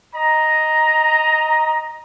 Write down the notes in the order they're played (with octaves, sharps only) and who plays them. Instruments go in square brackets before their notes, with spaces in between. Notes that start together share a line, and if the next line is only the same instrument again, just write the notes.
[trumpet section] D#5 A#5